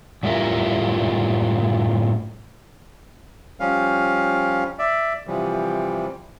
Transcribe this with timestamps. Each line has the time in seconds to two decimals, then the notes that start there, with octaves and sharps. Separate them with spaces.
0.23 F#2 A2 G3 E4 F4 A#4
3.60 F3 G3 C#4 F5
4.79 D5 E5
5.27 C3 E3 F3 G3